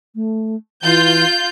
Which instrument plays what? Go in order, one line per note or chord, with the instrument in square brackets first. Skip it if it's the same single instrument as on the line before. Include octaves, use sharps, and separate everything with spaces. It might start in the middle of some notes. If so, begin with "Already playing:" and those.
[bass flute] A3
[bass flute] E3 [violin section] F4 G6